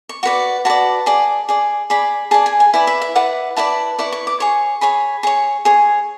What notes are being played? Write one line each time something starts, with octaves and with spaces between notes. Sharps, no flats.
C#6
F#4 B4 D5 C#6
F#4 B4 D5 A5
G#4 D5
G#4 D5
G#4 D5 B5
G#4 D5 A5
G#5
G#5
E4 B4 D5 G#5
E5
E5
E4 B4 D5 F#5
E4 B4 D5 A5
E4 B4 D5 C#6
C#6
D6
G#4 C#5 C#6
G#4 C#5 B5
G#4 C#5 C#6
G#4 C#5